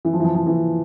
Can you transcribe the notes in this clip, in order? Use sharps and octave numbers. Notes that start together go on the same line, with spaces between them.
E3
F3
E3
F3
F3
E3